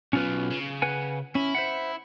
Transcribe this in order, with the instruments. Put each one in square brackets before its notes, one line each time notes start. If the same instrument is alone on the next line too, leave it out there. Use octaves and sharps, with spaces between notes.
[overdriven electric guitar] B1 B2 [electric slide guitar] C#4 F4 B4
[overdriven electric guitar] C#3
[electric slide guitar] B4 F#5 G#5
[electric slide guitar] C#4 [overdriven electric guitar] E4
[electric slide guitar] C5 E5 F#5